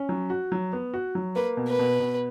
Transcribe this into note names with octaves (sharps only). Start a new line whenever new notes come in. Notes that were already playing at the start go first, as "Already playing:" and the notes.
Already playing: C#4
F#3
F#4
F#3
B3
F#4
F#3
A#3 B4
B2
B4
B2
B2